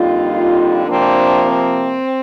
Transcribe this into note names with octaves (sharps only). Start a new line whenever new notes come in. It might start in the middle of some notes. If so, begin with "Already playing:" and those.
Already playing: F2 D3 G3 A#3 D#4 F4
C3 F3 A#3 C4 D4
C4